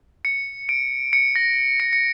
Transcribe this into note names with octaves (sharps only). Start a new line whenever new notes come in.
C#7
D7
C#7
A#6
C#7
C#7